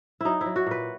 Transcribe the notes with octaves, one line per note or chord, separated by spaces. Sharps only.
F#3 D#4 E4
F#3 E4
F#4
A#2 B4